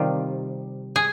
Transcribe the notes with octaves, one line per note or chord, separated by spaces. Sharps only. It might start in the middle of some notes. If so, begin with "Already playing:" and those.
Already playing: C3 D#3 G3 F4
G#4